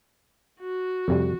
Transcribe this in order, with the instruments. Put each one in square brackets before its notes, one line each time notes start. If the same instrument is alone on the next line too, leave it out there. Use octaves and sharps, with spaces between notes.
[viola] F#4
[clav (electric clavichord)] F2 C3 G3